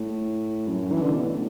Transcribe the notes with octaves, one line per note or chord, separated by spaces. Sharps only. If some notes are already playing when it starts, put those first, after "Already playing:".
Already playing: A2
F#2
E3
D3
B2
A2